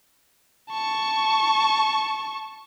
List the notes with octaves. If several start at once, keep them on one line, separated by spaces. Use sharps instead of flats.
A5 C#6